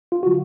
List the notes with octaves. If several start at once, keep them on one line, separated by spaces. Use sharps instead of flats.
F4
D3 F#3 F#4